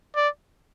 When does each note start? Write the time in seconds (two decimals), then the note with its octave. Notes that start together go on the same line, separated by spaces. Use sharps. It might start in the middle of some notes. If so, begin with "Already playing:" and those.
0.16 D5